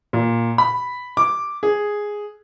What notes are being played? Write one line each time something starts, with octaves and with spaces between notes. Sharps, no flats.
A#2
B5
D6
G#4